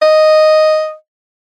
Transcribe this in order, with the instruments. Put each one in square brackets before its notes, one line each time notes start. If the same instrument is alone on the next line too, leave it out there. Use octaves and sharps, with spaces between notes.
[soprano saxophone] D#5